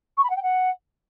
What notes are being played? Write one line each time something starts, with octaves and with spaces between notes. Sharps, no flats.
C#6
B5
F#5
G5
F#5